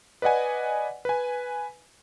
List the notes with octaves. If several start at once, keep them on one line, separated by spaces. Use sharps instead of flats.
B4 D5 D#5 F#5 G#5
B4 G#5